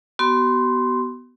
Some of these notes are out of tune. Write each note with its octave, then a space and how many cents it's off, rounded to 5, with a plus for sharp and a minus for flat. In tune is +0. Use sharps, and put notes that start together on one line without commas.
B3 +0 F#4 +45 C6 +0